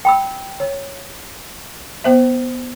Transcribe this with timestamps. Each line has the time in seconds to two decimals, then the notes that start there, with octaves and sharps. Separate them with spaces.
0.05 G5 B5 E6
0.60 C#5
2.04 B3 C5 E5